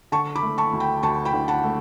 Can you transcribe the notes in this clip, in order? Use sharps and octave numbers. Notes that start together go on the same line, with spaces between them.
D3 A5 C#6
B5 D6
A3
A5 C#6
D2
G5 B5
D2 A5 C#6
G5 B5
D3
F#5 A5
A3